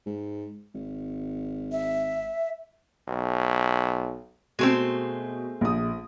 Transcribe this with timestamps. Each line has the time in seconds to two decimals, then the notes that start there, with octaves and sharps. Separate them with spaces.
0.06 G#2
0.74 G#1
1.72 E5
3.08 B1
4.59 B2 G#3 A3 C4
5.61 A#1 D#6